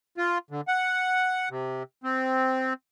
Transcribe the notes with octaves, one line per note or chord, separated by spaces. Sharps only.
F4
D3
F#5
C3
C4